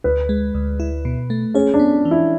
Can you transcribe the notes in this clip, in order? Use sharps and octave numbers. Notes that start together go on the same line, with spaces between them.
D2 B4
G#3
D2
E4
B2
A3
C#4 G#4
D4
B3
E3
E4